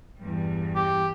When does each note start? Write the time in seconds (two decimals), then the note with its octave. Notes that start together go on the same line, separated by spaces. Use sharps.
0.20 E2 G2 G3
0.75 G4